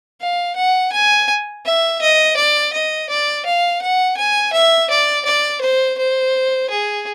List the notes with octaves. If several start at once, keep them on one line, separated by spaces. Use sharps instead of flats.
F5
F#5
G#5
E5
D#5
D5
D#5
D5
F5
F#5
G#5
E5
D5
D5
C5
C5
G#4